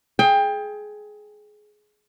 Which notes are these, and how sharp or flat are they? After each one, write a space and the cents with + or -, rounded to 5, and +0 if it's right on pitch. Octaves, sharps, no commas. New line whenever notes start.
G#4 +20 G5 +25